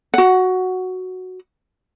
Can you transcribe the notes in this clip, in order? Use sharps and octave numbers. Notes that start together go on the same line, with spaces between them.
F#4 F#5